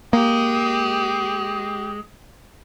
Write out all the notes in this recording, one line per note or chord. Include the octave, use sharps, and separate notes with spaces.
G#3 A#3 G4